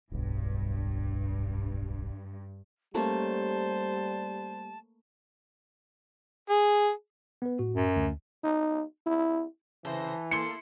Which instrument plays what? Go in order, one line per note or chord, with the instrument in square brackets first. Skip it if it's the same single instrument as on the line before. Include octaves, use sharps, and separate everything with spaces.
[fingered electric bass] D1 B1 [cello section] G2
[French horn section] G3 G4 [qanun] A3 A#3 C#4 [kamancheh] C5 [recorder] A5
[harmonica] G#4
[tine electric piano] B3 B4
A2 F#4
[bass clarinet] F#2
[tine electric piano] D2
[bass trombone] D#4
E4
[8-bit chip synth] C#3 C5 A#6 [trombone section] E3 [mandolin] A4
[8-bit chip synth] A#3 A4 [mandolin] E4 C6 [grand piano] C#7